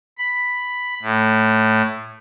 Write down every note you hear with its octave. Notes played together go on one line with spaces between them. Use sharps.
B5
A2